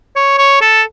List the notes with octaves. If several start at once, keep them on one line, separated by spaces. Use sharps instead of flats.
C#5
C#5
A4